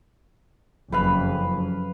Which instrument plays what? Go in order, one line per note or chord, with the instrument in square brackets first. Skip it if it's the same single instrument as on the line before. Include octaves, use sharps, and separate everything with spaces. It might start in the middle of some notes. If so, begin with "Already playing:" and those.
[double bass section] F#1 F2 [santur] B4 F5 B5